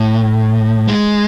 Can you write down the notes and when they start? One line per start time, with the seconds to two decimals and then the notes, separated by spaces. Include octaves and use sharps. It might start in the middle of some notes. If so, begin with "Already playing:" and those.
Already playing: A2
0.88 G#3